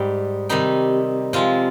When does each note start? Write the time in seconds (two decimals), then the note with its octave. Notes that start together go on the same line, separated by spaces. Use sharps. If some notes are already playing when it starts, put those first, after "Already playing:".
Already playing: G#2 G3
0.49 C3 D#3 G3 D#4
1.33 C3 F3 G#3 F4